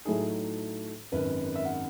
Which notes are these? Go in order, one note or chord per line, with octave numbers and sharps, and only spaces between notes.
A2 F#3 A3 D#4 G#4
G#1 F#2 D#3 B4
E5
F#5